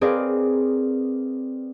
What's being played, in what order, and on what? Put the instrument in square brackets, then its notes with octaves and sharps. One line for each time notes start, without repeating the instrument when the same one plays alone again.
[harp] C4 G#4 A#4 B4 D5 F5